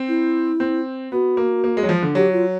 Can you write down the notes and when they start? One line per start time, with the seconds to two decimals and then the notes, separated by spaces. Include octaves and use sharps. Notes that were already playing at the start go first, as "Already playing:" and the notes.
Already playing: C4
0.08 E4
0.60 C4
1.12 B3 F#4
1.37 A#3
1.64 A#3
1.77 G#3
1.83 F#3
1.89 F3
2.02 D3
2.15 F#3 G4
2.33 F4